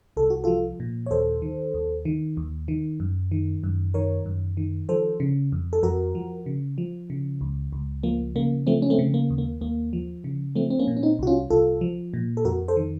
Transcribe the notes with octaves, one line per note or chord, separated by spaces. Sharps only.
C2 A4
F#4
F3 F4 A4
A#2
C#5
D#2 A4 C5
D#3
D#2
D#3
D#2
D#3
F#2
D#3
F#2
D#3 A#4 C#5
F#2
D#3
F3 A4 C5
C#3
F2
A4
F2 F#4 A#4
F3
C#3
F3
C#3
C#2
C#2
F3 A#3
C#3 A#3
F3 A3 C4
C#4
A3 C4
C#3
A#3
D#2
A#3
D#2 A#3
F3
C#3
F3 A3 C4
C4
A#3 C#4
A#2
C#4
C4 D#4
C2 F#4
C#4 F4
C2 F4 A4
F3
A#2
A4
F2 F#4 A#4
A4 C5
D#3